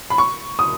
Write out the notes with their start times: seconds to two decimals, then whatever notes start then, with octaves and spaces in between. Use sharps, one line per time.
0.10 B5
0.18 C#6
0.59 D#6